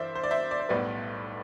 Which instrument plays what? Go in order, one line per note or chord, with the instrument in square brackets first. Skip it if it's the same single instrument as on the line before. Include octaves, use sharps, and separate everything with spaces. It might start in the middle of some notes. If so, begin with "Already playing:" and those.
Already playing: [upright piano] G2 E3 C5 D5 E5
C5
D5
C5 E5
D5
C5
B1 A2 G3 B3 B4 D5